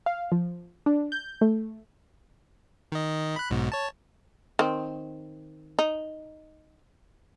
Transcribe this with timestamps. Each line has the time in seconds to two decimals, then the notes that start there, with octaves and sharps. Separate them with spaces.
0.06 F5
0.32 F3
0.86 D4
1.12 G6
1.41 A3
2.92 D#3 D#5
3.36 B5 F#6
3.50 B1 G#2 B2
3.72 C#5 A5
4.59 D#3 C4
5.79 D#4